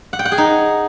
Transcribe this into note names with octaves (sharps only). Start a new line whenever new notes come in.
F#5
G5
F#5
G#4
D#4